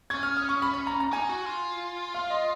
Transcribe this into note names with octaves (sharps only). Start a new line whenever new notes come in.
C#4 G#6
F6
D#6
C#6
B5
B5
A#5
A#5
D#4 G#5
F#4
F4
F5
D#5